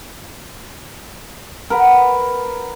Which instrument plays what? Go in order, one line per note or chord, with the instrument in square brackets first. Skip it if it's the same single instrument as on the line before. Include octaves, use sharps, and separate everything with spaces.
[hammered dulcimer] A#4 B4 F#5